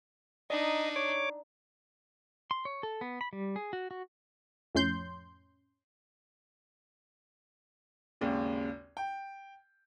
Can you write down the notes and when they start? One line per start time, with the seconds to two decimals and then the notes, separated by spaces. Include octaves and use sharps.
0.50 D4 D#4 D5 D#5 A#5
0.96 C#5 D6
2.51 C6
2.65 C#5
2.83 A4
3.01 B3
3.21 B5
3.33 G3
3.56 G#4
3.73 F#4
3.91 F#4
4.75 F2 A2 C#4 C6 G6
8.21 G#1 D#2 C#3
8.97 G5